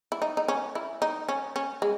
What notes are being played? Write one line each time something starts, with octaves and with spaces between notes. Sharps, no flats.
E4
D#4
D#4
C#4
E4
D#4
C#4
C#4
G#3